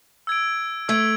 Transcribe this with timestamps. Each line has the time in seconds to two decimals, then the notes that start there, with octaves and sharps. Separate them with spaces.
0.27 E6 G#6 D7
0.88 A3 E6 G#6 D7